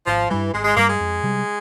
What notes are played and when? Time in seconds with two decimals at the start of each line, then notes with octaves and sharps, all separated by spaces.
0.07 G#1 F3
0.30 G2 E3 G3
0.53 G#1 G#3
0.64 G#3
0.76 G2 G3 A#3
0.88 G#3
1.00 F2
1.23 C3 G3